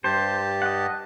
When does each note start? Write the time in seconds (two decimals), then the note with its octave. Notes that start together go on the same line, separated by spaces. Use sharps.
0.04 G2 G4 C5 A5
0.62 D#5 F#5